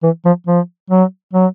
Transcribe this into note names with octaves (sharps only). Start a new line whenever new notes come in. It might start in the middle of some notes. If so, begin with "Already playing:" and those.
E3
F3
F3
F#3
F#3